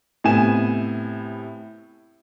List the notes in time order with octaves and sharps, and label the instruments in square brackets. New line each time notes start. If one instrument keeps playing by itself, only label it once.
[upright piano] A2 C3 B3 G#5 E7